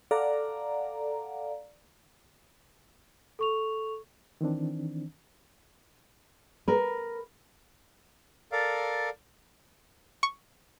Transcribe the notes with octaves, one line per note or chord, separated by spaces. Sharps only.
A4 D5 F5 F#5 A#5
A4 C#6 F7
D#3 E3 C4 D4
A#4 B4
A4 A#4 D5 F5
C#6